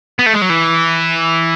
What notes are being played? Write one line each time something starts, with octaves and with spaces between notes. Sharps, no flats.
B3
A3
G#3
F#3
E3